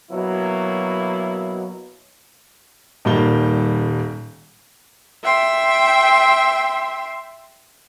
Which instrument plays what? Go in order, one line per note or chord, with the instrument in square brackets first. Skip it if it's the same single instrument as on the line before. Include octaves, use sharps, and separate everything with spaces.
[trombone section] B2 F#3 A#3 E4
[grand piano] D#1 D#3 G3 A#3 G7
[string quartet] E5 G5 C6